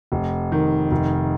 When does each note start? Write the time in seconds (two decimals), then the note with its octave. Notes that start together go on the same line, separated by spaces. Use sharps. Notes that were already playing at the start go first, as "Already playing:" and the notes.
0.12 F1
0.52 D#3
0.91 F1